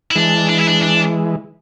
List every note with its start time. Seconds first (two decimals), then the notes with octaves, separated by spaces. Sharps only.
0.11 E4
0.16 E3 G#3 D4
0.49 D4
0.59 E4
0.69 D4
0.83 D4